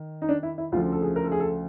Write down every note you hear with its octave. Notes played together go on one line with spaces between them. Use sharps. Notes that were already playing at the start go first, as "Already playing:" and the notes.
Already playing: D#3
D#4
D4
E4
E4
D2 C#3 F3 F4
A4
G#4
A#4
A4
G#4
A4